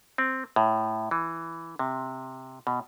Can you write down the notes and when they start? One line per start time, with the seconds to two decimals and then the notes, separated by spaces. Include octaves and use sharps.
0.18 C4
0.56 A2
1.11 E3
1.79 C3
2.67 B2